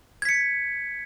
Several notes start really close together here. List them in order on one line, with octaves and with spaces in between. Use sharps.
G#6 B6 C#7